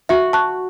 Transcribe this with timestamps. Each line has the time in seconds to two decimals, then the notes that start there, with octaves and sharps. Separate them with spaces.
0.09 F#4 E5
0.33 A5 C#6 F#6